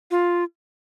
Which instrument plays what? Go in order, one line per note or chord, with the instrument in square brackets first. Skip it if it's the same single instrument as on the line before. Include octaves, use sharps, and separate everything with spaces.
[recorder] F4